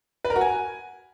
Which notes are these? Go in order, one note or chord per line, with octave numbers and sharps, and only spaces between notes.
B4
A#4
F#4
G#5